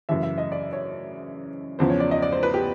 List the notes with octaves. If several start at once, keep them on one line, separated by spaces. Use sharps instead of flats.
F#2 C#3 E3 E5
E5
D#5
D5
C#5
E2 C#3 F3 C5
C#5
D5
D#5
D5
C5
B4
G4